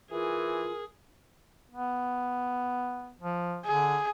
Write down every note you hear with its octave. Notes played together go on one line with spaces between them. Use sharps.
E3 F4 G#4 A#4
B3
F3
D3 G#4